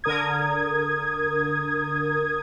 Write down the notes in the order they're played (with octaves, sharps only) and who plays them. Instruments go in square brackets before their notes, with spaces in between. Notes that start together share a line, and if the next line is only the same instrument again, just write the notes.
[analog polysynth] D3 A#4 D#6 G#6